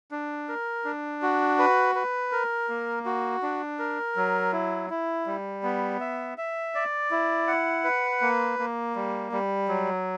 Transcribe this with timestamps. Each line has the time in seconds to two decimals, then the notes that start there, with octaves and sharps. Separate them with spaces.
0.11 D4
0.49 A#4
0.85 D4
1.22 F#4
1.59 B4
1.95 B4
2.32 A#4
2.69 A#3
3.06 F#4
3.43 D4
3.79 A#4
4.16 F#3
4.53 E4
4.90 E4
5.26 G3
5.63 B3
6.00 E5
6.38 E5
6.75 D5
7.11 E4
7.47 F#5
7.84 B4
8.22 A#3
8.59 A#3
8.95 G3
9.32 G3
9.68 F#3